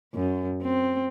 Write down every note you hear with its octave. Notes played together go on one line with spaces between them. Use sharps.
F#2
C4